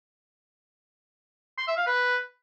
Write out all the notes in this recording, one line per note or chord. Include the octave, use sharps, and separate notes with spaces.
C6
E5
F5
B4